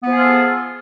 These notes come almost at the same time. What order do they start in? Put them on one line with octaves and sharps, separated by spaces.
B3 F3 G#4 F4 A4